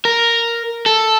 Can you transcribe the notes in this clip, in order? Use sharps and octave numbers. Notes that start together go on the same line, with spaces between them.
A#4
A4